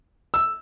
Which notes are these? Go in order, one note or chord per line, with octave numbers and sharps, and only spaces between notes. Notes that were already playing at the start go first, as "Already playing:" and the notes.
E6